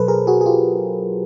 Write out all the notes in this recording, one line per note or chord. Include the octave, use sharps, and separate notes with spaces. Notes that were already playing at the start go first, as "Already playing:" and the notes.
Already playing: B2 F#3 A4 B4 C5
G#4 A#4
F#4 G#4
G#4
F4 G4